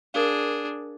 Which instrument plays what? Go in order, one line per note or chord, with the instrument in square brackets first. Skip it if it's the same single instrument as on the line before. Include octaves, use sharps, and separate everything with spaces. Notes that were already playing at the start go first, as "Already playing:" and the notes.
[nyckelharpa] D4 G#4 [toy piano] A#4 F5